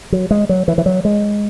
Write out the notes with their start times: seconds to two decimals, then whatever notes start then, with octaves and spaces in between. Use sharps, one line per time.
0.12 F#3
0.31 G#3
0.49 F#3
0.68 E3
0.78 E3
0.86 F#3
1.05 G#3